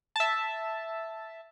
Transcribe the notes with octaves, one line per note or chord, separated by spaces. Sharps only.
E5 A5